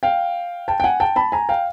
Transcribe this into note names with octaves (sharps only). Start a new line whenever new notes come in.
F5 G5
G5 A5
G5
F#5 G#5
G5 A5
A5 B5
G#5 A#5
F5 G5